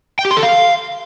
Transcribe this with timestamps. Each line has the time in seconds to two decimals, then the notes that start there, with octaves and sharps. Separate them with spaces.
0.19 G5
0.25 G4
0.31 C6
0.37 A4
0.43 F5